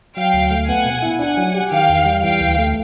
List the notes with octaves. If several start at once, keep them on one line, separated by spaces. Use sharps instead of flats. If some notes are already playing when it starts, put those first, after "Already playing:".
F#3 F5 G5
D2
A3
B3 F#5 G#5
B2
E4
D4 F#5 G#5
F#3
G4
D#3 F5 G5
E2
G3
E3 F5 G5
D2
A3